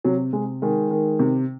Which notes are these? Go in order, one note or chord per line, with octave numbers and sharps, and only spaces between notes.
C3 F#3
C3 G#3
D#3 G#3
D#3
C3